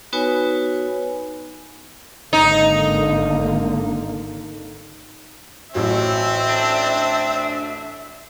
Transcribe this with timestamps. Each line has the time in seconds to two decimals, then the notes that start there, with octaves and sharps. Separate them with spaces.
0.13 B3 D#4 F#4 B4 C#5 G#5
2.33 G#1 D3 A#3 D#4
5.75 A1 A2 F#3 C4 E5
6.49 D4